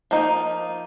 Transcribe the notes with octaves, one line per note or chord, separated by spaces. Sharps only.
F3 A#3 D#4